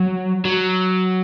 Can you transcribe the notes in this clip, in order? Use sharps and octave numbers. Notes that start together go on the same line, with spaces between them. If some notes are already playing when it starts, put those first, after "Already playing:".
Already playing: F#3
F#3